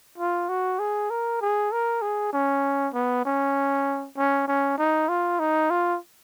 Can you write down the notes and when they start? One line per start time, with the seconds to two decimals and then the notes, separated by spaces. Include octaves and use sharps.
0.18 F4
0.49 F#4
0.80 G#4
1.11 A#4
1.41 G#4
1.72 A#4
2.02 G#4
2.33 C#4
2.94 B3
3.25 C#4
4.17 C#4
4.48 C#4
4.78 D#4
5.09 F4
5.40 D#4
5.70 F4